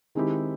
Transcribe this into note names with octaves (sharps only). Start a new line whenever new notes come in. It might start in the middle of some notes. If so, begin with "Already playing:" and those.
D#3 G#3 C4 E4 G4